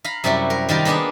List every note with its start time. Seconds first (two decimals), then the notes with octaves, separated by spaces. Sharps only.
0.04 F5 A#5 B5
0.24 F#2 C3 G3 E4 F#4
0.50 A#4
0.69 D#3 G3 F4 A#4
0.85 A#3 B3 D4 G#4 B4